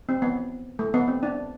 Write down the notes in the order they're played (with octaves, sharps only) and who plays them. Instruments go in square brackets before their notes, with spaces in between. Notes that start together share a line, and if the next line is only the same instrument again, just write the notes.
[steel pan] C4
B3
A3
B3
C4
D4